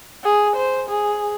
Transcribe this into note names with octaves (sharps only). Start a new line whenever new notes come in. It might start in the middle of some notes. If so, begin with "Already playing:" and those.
G#4
C5
G#4